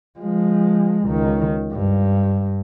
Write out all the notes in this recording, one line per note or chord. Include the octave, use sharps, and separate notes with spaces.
F3 G#3
C#2 D#3
G2